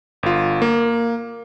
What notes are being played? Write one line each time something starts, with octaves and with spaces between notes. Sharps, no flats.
G1 F4
A#3